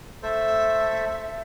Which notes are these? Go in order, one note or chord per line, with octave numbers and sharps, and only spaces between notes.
A3 A4 C5 E5